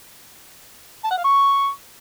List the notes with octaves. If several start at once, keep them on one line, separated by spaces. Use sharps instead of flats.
A5
F#5
F5
C#6